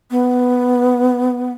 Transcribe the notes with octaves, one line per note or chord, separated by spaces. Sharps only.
B3